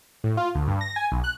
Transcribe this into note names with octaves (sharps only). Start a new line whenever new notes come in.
A2
F4
D2
G2
A#6
G#5
B1
F#6